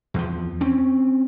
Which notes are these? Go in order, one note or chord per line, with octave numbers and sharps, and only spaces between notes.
E2 F3
C4 C#4